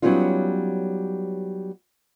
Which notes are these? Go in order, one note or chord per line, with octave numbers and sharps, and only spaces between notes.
F#3 G3 B3 C#4 D#4 F4